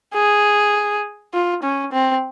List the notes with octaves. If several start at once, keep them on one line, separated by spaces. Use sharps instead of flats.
G#4
F4
C#4
C4